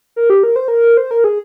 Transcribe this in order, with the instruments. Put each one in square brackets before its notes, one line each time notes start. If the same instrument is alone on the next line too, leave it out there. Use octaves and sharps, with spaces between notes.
[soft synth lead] A#4
G4
A#4
C5
A#4
C5
A#4
G#4